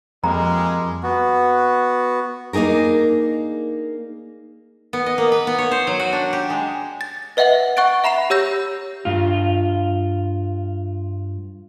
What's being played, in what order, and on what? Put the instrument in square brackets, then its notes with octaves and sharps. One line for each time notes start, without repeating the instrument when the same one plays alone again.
[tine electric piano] F2 [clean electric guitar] F3 G3 A#3 [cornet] G#3 [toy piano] A#5
[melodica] B3 F#4
[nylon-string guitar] A#3 D4 D#4 G#4 A#4
[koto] B3
D#5
A#3
B4
B3
C#5
C5
F#3
F#4
D4
G4
G#3
[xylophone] A6
B4 D#5 E5 F#5 A6 F#7
F#5 C#6 F#6 A6 D7
E5 A#5 B5 C7 E7
G4 C#5 E6 G6 A#6
[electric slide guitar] G2 F4